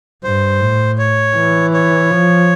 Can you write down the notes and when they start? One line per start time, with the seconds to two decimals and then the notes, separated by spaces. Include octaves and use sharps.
0.24 G2 C5
0.61 A2
0.98 C#5
1.36 E3
1.74 C#5
2.11 F3